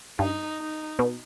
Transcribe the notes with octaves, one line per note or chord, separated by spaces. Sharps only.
G2 D#4
D#4
B2